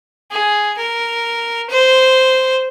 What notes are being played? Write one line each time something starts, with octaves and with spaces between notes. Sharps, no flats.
G#4
A#4
C5